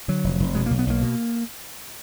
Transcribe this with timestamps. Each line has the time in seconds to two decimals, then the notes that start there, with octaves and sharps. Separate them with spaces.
0.08 D3 F#3
0.24 F1
0.40 F1
0.55 B2 G#3
0.66 B1 A#3
0.79 B3
0.87 B1 A#3
1.02 B2